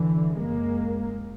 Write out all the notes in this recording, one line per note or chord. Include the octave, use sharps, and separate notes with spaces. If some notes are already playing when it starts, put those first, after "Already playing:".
Already playing: D3 E3
F#2 C#3 G#3 A#3